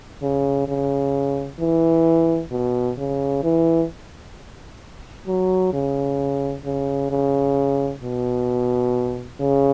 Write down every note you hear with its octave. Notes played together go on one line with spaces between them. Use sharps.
C#3
C#3
E3
B2
C#3
E3
F#3
C#3
C#3
C#3
B2
C#3